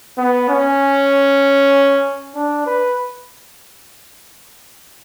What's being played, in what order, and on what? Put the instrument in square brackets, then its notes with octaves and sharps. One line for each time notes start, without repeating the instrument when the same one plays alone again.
[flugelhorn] B3
C#4
D4
B4